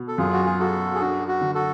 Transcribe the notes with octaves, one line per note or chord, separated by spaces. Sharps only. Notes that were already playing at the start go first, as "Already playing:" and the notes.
Already playing: B2
A4
F#2 F4 G#4
F#4
G#4
F#3 F#4 A4
G#4
D4 F#4
F#4
D3
F#4 A4